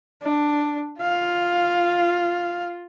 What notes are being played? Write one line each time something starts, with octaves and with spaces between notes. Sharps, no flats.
D4
F4 F5